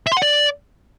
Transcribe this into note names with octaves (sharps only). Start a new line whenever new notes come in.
E5
C6
F#5
D5